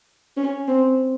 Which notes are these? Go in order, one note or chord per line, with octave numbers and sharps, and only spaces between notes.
C#4
C4